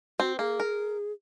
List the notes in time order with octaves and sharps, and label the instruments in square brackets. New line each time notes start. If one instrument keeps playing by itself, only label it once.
[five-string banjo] C4 [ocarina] F#4
[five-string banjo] A#3 [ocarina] G#4
[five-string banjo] A#4